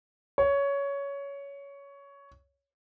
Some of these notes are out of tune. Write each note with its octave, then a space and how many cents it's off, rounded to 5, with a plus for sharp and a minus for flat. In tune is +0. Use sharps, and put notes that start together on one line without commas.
C#5 +15